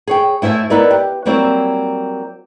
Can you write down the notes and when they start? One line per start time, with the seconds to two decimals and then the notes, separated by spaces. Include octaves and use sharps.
0.07 G#4 C#5 G5
0.42 A2 E4 C5 E5 G#5
0.70 B3 D#4 E4 A#4 D5
0.91 G4
1.26 F#3 G3 A#3 C4 E4